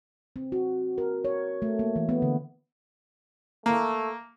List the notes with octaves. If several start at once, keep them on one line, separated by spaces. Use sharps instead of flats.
C4
F#4
A#4
C#5
A3
A#3
E3
B3
D3
A3 A#3